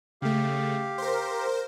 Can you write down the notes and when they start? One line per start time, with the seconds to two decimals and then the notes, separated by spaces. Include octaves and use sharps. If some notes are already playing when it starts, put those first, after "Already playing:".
0.22 C#3 A3 G4 F5
0.98 A#4 C5